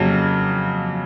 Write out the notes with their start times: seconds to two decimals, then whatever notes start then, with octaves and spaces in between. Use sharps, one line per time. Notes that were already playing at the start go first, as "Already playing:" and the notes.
Already playing: F2 C#3 F#3 A#3